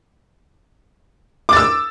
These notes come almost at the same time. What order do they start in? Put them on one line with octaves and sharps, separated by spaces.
D6 A6 E6